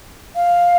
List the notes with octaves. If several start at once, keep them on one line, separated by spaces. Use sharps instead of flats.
F5